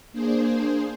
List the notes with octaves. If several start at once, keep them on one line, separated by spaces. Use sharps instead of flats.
A#3 D4 G#4 C5